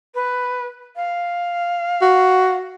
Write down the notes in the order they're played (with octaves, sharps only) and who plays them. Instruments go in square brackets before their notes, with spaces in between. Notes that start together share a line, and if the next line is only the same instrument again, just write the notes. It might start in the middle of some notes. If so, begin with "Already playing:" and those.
[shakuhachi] B4
F5
[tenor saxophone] F#4